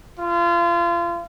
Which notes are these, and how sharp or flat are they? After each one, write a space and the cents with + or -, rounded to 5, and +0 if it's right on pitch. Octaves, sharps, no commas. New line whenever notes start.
F4 -30